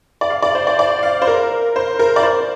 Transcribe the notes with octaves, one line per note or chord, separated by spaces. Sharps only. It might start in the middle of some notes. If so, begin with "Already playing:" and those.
D5
F5
D5
C5
D5
D5
F5
C5
A#4
C5
A#4
D5
C5